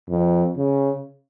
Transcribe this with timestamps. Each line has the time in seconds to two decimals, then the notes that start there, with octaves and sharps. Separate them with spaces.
0.09 F2
0.57 C#3